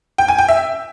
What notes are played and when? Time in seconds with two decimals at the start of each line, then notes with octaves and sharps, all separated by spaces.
0.18 G5
0.28 G#5
0.38 G5
0.49 E5